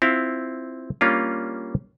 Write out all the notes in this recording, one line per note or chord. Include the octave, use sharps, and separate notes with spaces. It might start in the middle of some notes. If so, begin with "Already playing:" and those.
C4 E4 F4 F5
G3 A#3 C#4 D4 F4